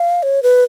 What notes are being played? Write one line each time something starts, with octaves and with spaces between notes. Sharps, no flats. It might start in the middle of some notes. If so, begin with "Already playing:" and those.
Already playing: F5
C#5
B4